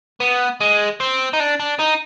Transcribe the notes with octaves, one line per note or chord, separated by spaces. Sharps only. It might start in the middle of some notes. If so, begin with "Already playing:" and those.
B3
G#3
C4
D#4
D4
D4
D#4